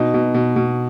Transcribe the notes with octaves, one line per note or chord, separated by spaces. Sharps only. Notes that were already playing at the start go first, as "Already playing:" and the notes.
Already playing: B2 D#4
B2
B2
B2